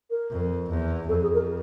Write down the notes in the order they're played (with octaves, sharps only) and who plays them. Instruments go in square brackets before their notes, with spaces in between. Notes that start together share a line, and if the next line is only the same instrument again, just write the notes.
[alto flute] A#4
[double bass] F2
E2
[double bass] F2 [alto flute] A4
[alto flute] G#4
A#4